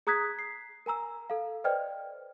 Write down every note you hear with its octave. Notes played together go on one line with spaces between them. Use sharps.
G#4 A#5 D#6 F#6 G#6 B6
C7
A#4 G#5 A#5 E6
A4 F5
B4 C5 D5 D#5 G5 F6